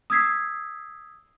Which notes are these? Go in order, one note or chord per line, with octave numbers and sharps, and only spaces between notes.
D#6 E6 G#6 B6 C7